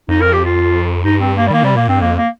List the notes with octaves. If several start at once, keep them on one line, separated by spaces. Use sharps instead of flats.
F2 D#4
A#4
G4
F4
G2 D#4
C4
A#3
G3
D#3 A#3
C3 G3
A#2 A#3
G2 C4
F2 A#3
A#3